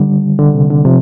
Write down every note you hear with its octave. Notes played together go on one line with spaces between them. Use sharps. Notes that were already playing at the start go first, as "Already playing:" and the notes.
Already playing: D3 G3
D3
C3
D3
C3 F3